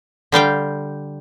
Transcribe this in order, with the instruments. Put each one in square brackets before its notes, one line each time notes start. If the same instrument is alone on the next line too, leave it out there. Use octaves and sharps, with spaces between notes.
[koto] D3 G3 F5 G5